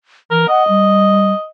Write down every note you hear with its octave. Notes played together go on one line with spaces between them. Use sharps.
E3 A#4
D#5 F#5
G3